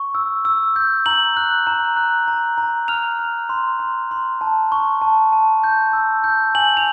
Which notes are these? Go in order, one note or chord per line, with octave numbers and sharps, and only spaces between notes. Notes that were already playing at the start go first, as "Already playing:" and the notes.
Already playing: C#6
E6
E6
G6
A#5 F#7
F#6
A#5
F#6
A#5
A#5
F6 F7
F6
C6
C6
C6
A5
C#6
A5
A5
G6
E6
G6
G#5 F#7
F7